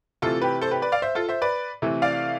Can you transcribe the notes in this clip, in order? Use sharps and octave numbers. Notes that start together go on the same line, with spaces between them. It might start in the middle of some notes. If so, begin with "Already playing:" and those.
C3 E3 A3 F4 A4
G4 B4
A4 C5
G4 B4
B4 D5
D5 F5
C5 E5
F4 A4
C5 E5
B4 D5
C3 E3 A3
D5 F5